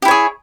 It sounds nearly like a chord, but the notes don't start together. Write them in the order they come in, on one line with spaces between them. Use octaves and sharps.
G4 E4 C#5 G#4